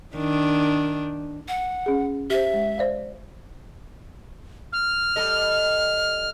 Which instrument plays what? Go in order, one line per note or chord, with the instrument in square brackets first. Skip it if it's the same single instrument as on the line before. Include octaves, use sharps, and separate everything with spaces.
[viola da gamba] D#3 D4
[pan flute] F#5
[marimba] C#4 G#4
[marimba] G4 C5 [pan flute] E5
[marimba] G#3
C5 D5 F5
[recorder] F6
[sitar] G3 A4 D#5